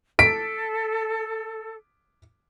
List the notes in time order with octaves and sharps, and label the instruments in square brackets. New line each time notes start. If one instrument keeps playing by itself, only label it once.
[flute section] A4 [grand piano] B6 D7